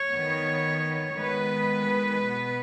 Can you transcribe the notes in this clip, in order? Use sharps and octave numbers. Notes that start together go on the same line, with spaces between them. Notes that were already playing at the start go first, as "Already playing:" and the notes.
Already playing: C#5
D#3 B3
D#3 G#3 B3 B4
B2 B3